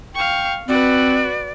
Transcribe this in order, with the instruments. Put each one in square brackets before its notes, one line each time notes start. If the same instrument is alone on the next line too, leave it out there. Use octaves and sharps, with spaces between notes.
[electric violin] F5 C#6 [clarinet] G5
[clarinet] C4 [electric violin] F#4 B4 [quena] D5